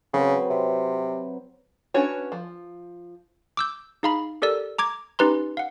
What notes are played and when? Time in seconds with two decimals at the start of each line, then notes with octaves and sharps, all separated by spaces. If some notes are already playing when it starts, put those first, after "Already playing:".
0.13 C#3 F#3 C4 B4
0.50 C3
1.94 C#4 D4 F#4 B4 C#5
2.32 F3
3.57 D6 E6 G6
4.03 D#4 G#4 F5 A#5 B5
4.42 G4 A4 A#4 D5 E6
4.78 A#5 D6 G#6
5.19 C#4 D#4 G4 B4 A#5 C6
5.57 F5 F#5